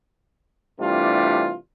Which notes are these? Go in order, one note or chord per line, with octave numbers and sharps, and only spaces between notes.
C3 E3 G3 A3 D4 F4